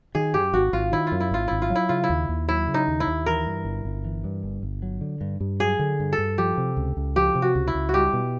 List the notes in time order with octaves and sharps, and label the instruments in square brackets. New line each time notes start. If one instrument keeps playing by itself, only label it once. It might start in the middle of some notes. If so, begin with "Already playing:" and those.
[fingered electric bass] D#3 [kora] G#4
[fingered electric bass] F#2 [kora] G4
[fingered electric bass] G#1 [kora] F#4
[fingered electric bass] G#1 [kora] F4
[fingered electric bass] D#3 [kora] E4
[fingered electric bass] F#2 [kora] F4
[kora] E4
[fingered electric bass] G#1 [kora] F4
[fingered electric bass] G#1 [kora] E4
[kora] F4
[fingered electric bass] F#3
[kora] E4
[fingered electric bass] C#3 [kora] F4
[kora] E4
[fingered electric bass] D#2
D#2
[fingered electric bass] F#3 [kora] E4
[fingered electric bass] C#3
[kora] D#4
[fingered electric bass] D#2
[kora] E4
[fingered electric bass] D#2
[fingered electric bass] E3 [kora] A#4
[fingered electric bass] G2
G1
G1
E3
G2
G1
G1
F#3
D3
G2
G2
[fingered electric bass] F#3 [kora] G#4
[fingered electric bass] D3
G2
[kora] A4
[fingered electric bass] G2
[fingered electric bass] F3 [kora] G4
[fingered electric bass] C3
C#2
C#2
[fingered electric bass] F3 [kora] G4
[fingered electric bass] C3
[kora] F#4
[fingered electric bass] C#2
[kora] E4
[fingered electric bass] C#2
[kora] F#4
[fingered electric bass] G3 [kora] G4
[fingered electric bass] B2